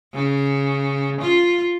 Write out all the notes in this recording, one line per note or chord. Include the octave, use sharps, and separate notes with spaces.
C#3
F4